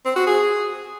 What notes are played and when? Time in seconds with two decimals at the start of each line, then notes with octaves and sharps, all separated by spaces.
0.05 C4
0.16 F#4
0.27 G#4